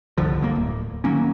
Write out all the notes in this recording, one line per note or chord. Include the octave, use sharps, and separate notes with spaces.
G1 C2 D3 F3
G2 B2 A#3
D1
D#3 F#3 A#3 C#4